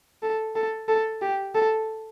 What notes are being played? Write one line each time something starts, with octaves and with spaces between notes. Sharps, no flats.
A4
A4
A4
G4
A4